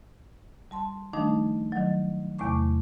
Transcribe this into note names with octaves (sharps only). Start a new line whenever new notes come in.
G3 A5 C6
D#3 F3 G3 A3 D4 D#4
D#3 F#3
E2 C3 A3 C#6 D6